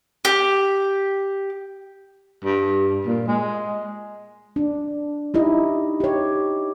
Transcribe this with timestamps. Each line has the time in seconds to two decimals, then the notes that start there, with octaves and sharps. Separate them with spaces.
0.25 G4
2.44 G2
3.06 A#2
3.27 G#3
4.56 D4
5.34 D#4 E4 G4 D#5
6.00 G4 C#5